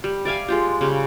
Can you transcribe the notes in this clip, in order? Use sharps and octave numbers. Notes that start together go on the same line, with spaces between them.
G3
D5 E5 F5 G#5
G#3 F4 G4
C#3 G3